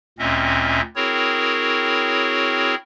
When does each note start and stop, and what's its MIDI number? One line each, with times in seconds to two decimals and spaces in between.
0.19 0.81 38
0.19 0.81 46
0.19 0.81 60
0.19 0.81 61
0.19 0.81 75
0.19 0.81 76
0.96 2.75 60
0.96 2.75 64
0.96 2.75 66
0.96 2.75 68
0.96 2.75 70
0.96 2.75 73